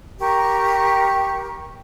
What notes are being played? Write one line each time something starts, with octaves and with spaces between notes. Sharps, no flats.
G4 A#4 C#6